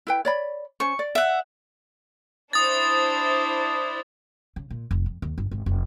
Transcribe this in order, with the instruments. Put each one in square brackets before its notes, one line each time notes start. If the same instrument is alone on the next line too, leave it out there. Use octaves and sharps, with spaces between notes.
[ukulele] E4 B4 G5
C#5 D5 B5
[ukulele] C#4 C5 [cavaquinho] C#6
[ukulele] D5
[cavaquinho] E5 F#5
[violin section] D4 E4 C5 [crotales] D#6 A6
[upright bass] C#3
A#2
F1
F2
D#2
G1
G#1
F1